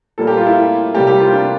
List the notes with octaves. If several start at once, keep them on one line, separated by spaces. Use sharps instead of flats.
A#2 G3 A#3 A4
G4
F4
E4
C3 G3 A#3 G4
G4
F4
D4